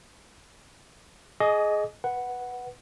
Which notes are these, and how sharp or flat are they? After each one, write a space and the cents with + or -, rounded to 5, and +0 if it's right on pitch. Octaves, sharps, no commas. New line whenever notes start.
G#4 +20 D#5 +0 D6 -35
B4 -5 F#5 +0